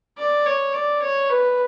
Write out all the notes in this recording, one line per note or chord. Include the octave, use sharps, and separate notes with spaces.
D5
C#5
D5
C#5
B4